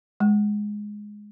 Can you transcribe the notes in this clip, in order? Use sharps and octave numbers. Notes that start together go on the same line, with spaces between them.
G#3